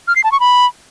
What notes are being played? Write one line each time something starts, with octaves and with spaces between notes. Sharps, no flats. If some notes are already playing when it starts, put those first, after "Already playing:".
F6
C7
A5
C#6
B5